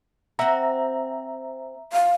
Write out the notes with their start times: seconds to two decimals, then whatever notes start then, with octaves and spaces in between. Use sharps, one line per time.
0.39 C4 F#4 E5 A#5
1.93 F5